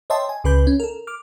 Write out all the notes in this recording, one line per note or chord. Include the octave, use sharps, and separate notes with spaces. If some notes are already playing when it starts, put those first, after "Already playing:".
C#5 D#5 E5 G5 A5 C6
G#5
C#2 C#3 B4 B5 G6
C#4
A4 A#4
D6 F6